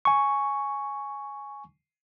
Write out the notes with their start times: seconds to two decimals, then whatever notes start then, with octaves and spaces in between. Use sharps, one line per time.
0.05 G#5 C#6